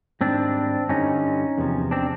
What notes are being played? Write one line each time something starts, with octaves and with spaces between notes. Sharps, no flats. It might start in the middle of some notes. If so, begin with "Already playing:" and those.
G#2 D#3 G3 C4 D4
G2 D3 G3 C#4 D#4
E2 C3 F3
C4 D4